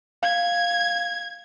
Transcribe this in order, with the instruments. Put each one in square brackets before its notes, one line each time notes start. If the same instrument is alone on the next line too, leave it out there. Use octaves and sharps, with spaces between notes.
[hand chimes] F5 [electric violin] G#6